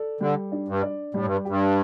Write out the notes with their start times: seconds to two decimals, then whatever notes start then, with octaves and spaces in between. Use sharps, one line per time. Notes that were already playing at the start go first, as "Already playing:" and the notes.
Already playing: A4 D5
0.21 D3 G3
0.52 D4
0.68 G2
0.83 D5
1.14 A2 G3
1.25 G2
1.45 G2 G4